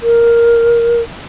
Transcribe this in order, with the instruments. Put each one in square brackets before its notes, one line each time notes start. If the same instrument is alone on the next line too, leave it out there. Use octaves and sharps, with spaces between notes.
[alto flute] A#4